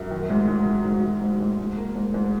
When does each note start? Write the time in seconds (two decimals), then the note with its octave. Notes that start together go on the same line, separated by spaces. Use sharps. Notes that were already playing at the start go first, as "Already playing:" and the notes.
Already playing: F#2
0.11 D#3
0.30 G#2
0.48 G#2
0.66 F#3
0.85 G#2
1.03 F#3
1.22 G#2
1.40 G#2
1.59 G#2
1.77 A#3
1.96 G#2
2.14 G#2